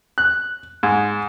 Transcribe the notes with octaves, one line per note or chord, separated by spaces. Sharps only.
F#6
G#2